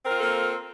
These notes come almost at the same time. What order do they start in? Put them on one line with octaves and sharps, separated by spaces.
C4 A#4 F4 A4 A#3